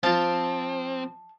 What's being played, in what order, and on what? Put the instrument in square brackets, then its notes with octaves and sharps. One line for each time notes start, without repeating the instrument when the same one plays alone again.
[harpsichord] F3 F4 [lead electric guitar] C4 [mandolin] A5